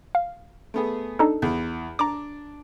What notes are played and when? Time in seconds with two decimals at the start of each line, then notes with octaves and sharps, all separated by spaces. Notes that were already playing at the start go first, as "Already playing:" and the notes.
0.15 F5
0.74 A3 B3 G#4
1.19 D4 D#4 A4
1.42 E2
1.99 D4 A#5 D6